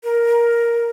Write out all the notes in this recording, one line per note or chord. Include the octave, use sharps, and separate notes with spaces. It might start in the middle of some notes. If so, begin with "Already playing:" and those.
A#4